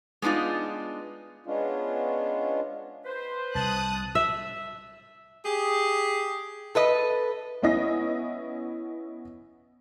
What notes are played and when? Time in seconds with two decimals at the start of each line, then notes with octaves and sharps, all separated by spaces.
0.22 G#3 B3 D4 D#4 F4
1.46 G#3 B3 C#4 D4 F4
3.05 B4 C5
3.55 C2 C3 A5 D#6 F#6
4.15 E5
5.45 G4 G#4
6.75 A4 B4 D#5
7.63 B3 C#4 E4 D#5 A#6